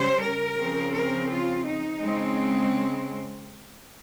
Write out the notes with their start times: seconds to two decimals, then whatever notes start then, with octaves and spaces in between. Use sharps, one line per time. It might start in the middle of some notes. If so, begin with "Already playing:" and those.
Already playing: C#3 G3 C#4 C5
0.22 A#4
0.58 C#3 F3 C4
0.93 A#4
1.29 F4
1.65 D#4
2.01 C#3 G#3 C4